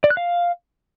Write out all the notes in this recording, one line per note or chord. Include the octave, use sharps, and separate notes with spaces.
D5
F#6
F5